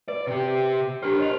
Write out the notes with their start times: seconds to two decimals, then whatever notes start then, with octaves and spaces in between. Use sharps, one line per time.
0.08 B4 D5
0.27 C3 G4
1.03 D4 G4 A#4 C5 F6
1.19 C#5 D#5 F7